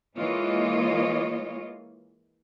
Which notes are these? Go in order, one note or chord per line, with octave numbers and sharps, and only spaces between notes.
E3 G#3 A#3 F4 C#5 D#5